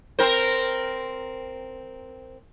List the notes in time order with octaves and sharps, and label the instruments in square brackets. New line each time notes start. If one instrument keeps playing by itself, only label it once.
[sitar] C4 A#4 C5